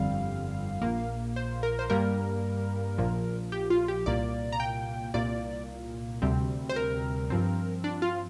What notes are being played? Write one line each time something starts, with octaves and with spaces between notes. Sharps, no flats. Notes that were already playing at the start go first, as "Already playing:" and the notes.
Already playing: G1 F2 D3 G3 C4 F5
A#1 A#2 A#3
C5
A#4
C5
G2 G3 A#3 A#4
A#1 A#2 F3
G4
F4
G4
C2 A#2 A#3 D5
A#5
G5
C2 A#2 A#3 D5
D2 C3 G3 C4
C5
A#4
G2 F3 C4
D4
F4